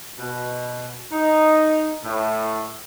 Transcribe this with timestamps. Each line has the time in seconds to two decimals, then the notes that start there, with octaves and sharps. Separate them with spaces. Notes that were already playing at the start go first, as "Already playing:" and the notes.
0.19 B2
1.12 D#4
2.04 A2